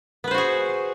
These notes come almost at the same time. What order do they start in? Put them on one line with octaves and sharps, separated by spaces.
B3 B4 C5 F#4 G#4